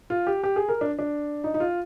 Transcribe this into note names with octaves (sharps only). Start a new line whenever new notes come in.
F4
G4
G4
G#4
A#4
D4
D4
D#4
D#4
F4